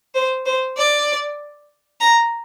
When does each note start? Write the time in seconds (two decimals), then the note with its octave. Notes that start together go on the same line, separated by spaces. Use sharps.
0.15 C5
0.46 C5
0.77 D5
2.00 A#5